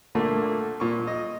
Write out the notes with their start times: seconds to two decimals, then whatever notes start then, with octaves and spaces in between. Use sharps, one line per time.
0.15 A#2 D3 A3 A#3
0.80 A#2 C#6
1.07 D#5